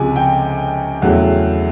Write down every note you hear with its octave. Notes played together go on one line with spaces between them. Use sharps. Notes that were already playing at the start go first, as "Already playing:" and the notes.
Already playing: C#2 C3 F3 G#3 G#5
G5
E2 C#3 F#3 A3